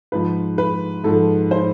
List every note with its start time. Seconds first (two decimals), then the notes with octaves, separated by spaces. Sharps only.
0.12 G#2 F3 B4
0.58 B4
1.04 G#2 F3 A4
1.51 C5